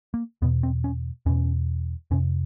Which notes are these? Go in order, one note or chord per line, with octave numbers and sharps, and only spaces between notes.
A#3
E2 B2 B3
C4
C#4
E2 B2 C#4
F2 C3 C#4